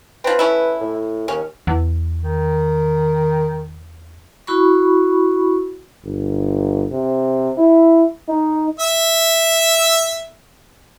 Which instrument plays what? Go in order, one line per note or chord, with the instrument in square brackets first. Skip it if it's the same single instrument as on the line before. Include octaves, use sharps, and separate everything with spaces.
[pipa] F3 C4 [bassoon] B4
[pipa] A3 C#4 E4
[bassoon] A2
[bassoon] D#2 [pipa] C#4
[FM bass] E2
[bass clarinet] D#3
[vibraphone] E4 F#4 B5 C#6
[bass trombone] G1
C3
E4
D#4
[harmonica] E5 E6